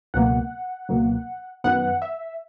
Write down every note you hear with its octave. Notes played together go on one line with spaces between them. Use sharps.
C#2 B2 F#3 A#3 F#5
C#2 B2 F#3 A#3
F#2 D#3 F#3 B3 F#5
E5